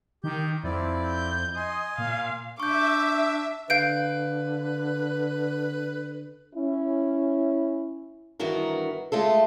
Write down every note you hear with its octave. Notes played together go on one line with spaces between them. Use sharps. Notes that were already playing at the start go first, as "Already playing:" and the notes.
D#3 G4 G6
F2 C4 E4 D5
G6
D#5 G#5 C6
A#2 F5
D4 E5 C#6 D6 G6
D3 B4 F5 G6 D7
C#4 E4
G2 D#3 E3 B3 F#4 A#4
G#3 A3 F4 A4